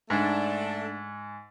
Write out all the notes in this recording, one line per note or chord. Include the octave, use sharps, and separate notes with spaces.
G#2 A3 D4